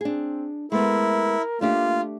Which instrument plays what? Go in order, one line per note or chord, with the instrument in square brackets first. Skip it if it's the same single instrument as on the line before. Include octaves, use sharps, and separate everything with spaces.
[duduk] C4 [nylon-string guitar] D4 G#4
[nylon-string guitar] G#3 A3 B3 [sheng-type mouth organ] E4 [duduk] A#4
[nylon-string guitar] A3 D4 G4 [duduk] A#3 [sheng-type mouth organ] F4